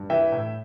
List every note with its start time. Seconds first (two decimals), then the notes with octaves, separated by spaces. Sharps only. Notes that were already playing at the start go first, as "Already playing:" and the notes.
Already playing: G2
0.10 E3 E5 G5
0.32 A2